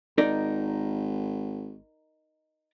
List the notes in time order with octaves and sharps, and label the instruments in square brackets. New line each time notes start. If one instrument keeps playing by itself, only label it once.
[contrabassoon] G#1 [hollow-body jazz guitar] D#4 A#4 D5